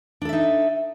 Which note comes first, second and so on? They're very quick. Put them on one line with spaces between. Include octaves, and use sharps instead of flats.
D4 A4 E5 D#4